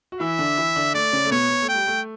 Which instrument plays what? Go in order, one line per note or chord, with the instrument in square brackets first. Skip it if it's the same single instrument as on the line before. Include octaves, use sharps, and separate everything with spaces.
[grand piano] F#4
[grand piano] E3 E4 [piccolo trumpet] E5
[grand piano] D3 D4
E3 E4
D3 D4
[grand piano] A3 [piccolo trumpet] D5
[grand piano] C#3 C#4
A3
[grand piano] B2 B3 [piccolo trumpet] C#5
[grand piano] B3
A3
[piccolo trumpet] G5
[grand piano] G3
A3